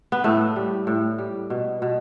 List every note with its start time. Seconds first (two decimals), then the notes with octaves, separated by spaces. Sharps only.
0.12 B3
0.24 A2 A3
0.56 G3
0.87 A2
1.18 G3
1.50 B2
1.82 B2